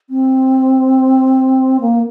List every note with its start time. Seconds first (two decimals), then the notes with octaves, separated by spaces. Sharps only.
0.10 C4
1.81 A#3